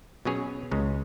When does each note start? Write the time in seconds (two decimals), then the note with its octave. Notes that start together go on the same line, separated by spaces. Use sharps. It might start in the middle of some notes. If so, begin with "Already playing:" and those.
0.25 B2 F#3 C#4 G#4 C#5
0.71 C#2 C#3 G#3 C#4